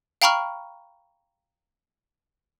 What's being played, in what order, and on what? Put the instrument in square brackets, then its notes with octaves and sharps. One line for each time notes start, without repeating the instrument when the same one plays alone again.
[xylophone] F5 G5 A#5 B5 C#6 F6